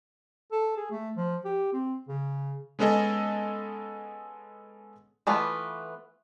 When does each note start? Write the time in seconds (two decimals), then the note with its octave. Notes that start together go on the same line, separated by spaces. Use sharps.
0.52 A4
0.77 G#4
0.91 A3
1.17 F3
1.45 G4
1.73 C4
2.09 C#3
2.79 G#3 B3 C#4 G#4 A4 D#5
5.27 E3 A3 B3 F4